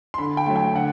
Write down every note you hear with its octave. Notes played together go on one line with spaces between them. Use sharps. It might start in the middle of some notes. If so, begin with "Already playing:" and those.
C6
D3 B5
G5
F#3 A3
G5
D3 F#5